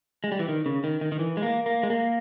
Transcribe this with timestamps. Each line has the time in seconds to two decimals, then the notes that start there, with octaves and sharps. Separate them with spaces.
0.24 G#3
0.32 G3
0.39 E3
0.49 D#3
0.66 C#3
0.84 D#3
1.01 D#3
1.12 D#3
1.19 E3
1.37 G#3
1.42 A#3
1.66 A#3
1.83 G#3
1.90 A#3